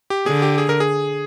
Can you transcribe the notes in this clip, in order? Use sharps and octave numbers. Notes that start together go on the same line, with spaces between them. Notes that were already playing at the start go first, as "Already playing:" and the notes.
G4
D3 G#4
G4
G#4
A#4
G#4